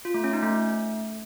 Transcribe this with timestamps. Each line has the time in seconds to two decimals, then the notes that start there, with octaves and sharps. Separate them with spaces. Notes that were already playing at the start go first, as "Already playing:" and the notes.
0.05 F4
0.14 A3
0.24 C#4
0.33 D#4
0.43 A3